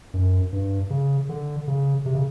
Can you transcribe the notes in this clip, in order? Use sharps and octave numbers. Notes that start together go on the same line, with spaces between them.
F#2
G2
C#3
D3
C#3
C3
C#3